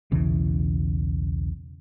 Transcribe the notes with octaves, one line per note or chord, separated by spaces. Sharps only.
B1 E2 C#3 E3